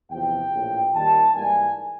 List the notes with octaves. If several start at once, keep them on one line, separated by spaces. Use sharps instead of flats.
E2 C3 F3 G5
A#1 A2 F3
D#2 D#3 G3 A5
G#2 E3 G3 A#3 G#5